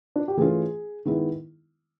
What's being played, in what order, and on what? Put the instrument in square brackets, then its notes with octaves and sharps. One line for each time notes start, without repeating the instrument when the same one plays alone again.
[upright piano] D4
G4
[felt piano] E3 A3 C#4 F4 [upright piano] G#4
[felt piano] D#3 G#3 B3 E4